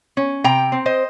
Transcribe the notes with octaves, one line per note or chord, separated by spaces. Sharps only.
C#4
C3 G5 A#5
C4
C5 D#5